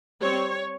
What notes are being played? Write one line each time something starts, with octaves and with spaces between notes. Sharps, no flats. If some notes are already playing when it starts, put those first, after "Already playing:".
G3 C4 C#5